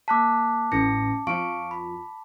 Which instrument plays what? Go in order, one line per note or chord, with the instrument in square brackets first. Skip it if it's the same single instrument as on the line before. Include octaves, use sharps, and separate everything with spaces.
[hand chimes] A#3 F#6 B6 [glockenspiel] A5 D6
[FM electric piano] A1 A2 E3 [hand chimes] C#4 A#6 C#7
[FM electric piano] F2 F3 [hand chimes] F5 C#6 D7
[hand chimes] B5